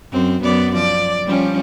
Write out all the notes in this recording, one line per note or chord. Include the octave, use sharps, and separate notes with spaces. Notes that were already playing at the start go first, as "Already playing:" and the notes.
F#2 C4
F#2 B3 D5
F3 D5
F3 G3 C#4